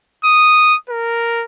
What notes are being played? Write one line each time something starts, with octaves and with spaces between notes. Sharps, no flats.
D#6
A#4